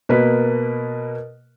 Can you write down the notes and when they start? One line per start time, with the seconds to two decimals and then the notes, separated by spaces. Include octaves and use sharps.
0.09 B2 A#3 A#4 B4